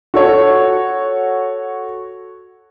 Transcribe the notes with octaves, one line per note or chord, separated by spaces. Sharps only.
F#4 A4 C#5